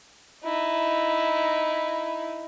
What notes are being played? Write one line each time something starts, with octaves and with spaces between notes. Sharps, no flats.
D#4 E4